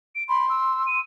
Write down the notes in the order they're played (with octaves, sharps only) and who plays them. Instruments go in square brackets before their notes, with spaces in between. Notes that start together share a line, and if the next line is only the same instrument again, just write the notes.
[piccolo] D7
[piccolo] B5 [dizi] C6
[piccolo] E6
D#7